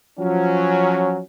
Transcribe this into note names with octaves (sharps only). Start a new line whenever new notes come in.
F3 F#3 C#4